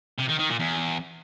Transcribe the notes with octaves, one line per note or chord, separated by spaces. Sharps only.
C3
D#3
D#3
A#2
E2